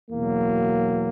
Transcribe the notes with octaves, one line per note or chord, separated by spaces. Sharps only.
E2 B2 F#3 A#3